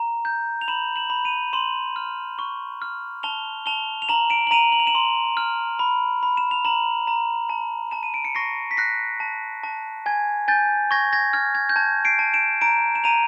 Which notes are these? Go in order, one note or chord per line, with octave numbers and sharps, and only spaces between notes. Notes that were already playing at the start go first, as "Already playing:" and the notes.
Already playing: A#5
G6
F7
B5 E7 F#7
E7 F#7
B5
D#7 F7
C6 E7 F#7
F6
C#6
F6
A5 F7 G7
A5 F7 G7
F7
A#5 E7 F#7
D7 E7
F#7
A#5 D#7 F7
F#7
F7
E7 F#7
C6
F6
B5
B5
E7
F7
A#5 E7 F#7
A#5
A5
A5 E7
D#7
D7
C#7
C#6 A#6 C7
B6
F#6 A#6 C7
A5
A5
G#5 G#6
G#5 G6 A6
C#6 G#6 A#6
G#6 A#6
F6 G#6
G#6
G6
A5 G#6
C7 D7
A5
D7 E7
A#5 D7 E7
E7
A#5 D#7 F7